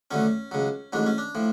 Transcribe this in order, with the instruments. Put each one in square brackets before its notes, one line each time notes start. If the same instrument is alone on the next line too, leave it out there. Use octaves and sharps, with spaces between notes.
[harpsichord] D2 D3 F#3 C#4
C#2 C#3 F#3
A1 G#2 F#3 D4
C#4
D4
A2 F3